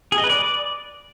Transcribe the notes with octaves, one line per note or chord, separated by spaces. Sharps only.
G#4
D#5
B4
D5